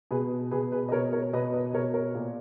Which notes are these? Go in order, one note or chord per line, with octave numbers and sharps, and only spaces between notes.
B2 G#4 B4
B2 G#4 B4
G#4 B4
D#5
B2 A#4 C#5
A#4 C#5
B2 B4 D#5
B4 D#5
B2 A#4 C#5
A#4 C#5
A#2